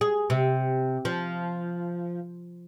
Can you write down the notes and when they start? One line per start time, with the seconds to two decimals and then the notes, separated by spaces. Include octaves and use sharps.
0.01 G#4
0.30 C3
1.05 F3